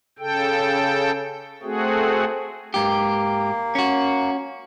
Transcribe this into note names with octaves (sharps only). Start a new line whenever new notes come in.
C#3 A4 G5
A3 C4 F#4 G#4
G#2 A#3 G4
C#4 F#4